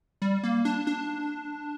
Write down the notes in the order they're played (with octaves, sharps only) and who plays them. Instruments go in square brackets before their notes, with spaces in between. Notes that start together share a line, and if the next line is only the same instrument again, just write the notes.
[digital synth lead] G3
A#3
D4
D4